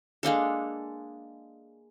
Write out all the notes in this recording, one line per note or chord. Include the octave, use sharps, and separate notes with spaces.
G#3 A#3 D4 A4